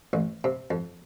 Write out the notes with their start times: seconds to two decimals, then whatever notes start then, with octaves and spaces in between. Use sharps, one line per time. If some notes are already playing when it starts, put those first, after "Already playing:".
0.13 A1
0.44 C3
0.71 F2